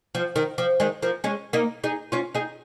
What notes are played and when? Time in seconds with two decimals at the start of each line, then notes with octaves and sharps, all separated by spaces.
0.15 F3
0.36 D#3
0.58 F3
0.80 D#3 G#3
1.02 F3 A#3
1.24 G#3 C#4
1.53 A#3 D#4
1.84 D#4 G#4
2.12 C#4 F4
2.34 D#4 G#4